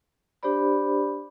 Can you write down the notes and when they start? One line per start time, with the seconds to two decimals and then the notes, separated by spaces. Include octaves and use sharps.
0.43 D4 G4 C5 D5 B5